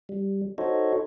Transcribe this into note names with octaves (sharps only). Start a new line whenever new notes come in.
G3
D#4 F#4 A4 C5 C#5 D#5